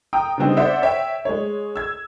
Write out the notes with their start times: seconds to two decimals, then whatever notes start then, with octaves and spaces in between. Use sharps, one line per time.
0.13 G5 A#5 D#6
0.38 C#3 G3 B3 C4 D4 D#4
0.57 C5 D5 E5 F#5
0.82 C#5 E5 G5
1.25 G#3 C#5
1.76 E6 G#6